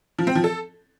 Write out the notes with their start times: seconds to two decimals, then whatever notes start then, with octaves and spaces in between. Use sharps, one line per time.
0.18 F3
0.27 C4
0.35 F3
0.44 A4